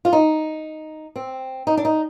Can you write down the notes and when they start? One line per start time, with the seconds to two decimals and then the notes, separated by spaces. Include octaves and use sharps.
0.05 F4
0.13 D#4
1.16 C4
1.67 D#4
1.77 D4
1.85 D#4